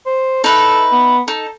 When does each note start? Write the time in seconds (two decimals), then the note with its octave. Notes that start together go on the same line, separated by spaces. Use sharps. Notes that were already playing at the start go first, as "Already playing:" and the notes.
0.06 C5
0.44 D#4 A4 B4 E5
0.92 B3
1.28 D#4 A4